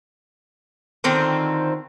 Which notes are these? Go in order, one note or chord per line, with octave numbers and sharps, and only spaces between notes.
D3 D#3 C4 F4